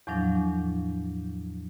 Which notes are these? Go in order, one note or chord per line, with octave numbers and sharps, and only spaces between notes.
E2 A2 F3 F#3 D4